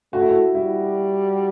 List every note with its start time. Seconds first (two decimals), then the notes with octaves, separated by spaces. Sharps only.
0.13 A3 F#4
0.21 E4
0.29 F#4
0.54 G3 E4